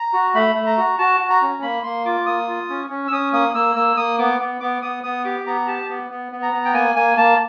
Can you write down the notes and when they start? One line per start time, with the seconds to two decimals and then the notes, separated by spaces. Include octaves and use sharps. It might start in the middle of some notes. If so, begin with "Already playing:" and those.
Already playing: A#5
0.13 F#4
0.34 A3 B5
0.55 A3
0.66 A#5
0.77 F#4
0.99 F#4 A5
1.20 F#4
1.30 A#5
1.42 C#4
1.62 A#3 B5
1.83 A#3 C6
2.05 F4 D6
2.26 A#3 D#6
2.48 F4
2.69 C#4
2.90 C#4
3.08 E6
3.11 C#4 D#6
3.33 A#3 D#6
3.54 A#3 E6
3.76 A#3 E6
3.97 A#3 D#6
4.19 B3 D6
4.40 B3
4.60 B3 D6
4.82 B3 D#6
5.03 B3 D#6
5.24 G4 D6
5.46 B3 A#5
5.67 G4 A5
5.89 B3
6.10 B3
6.32 B3
6.43 A#5
6.53 B3
6.65 G5
6.74 A#3 G#5
6.96 A#3 G#5
7.17 A#3 A5